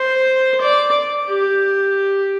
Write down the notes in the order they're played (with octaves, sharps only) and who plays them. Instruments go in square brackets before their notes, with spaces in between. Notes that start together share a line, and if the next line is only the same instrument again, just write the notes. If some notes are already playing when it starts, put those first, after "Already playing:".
Already playing: [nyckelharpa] C5
D5
G4